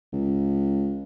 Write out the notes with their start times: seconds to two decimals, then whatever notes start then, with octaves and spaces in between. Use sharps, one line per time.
0.13 C#2